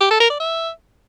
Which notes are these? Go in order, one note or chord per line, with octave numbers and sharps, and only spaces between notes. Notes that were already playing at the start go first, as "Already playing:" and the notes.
G4
A4
A#4
D5
E5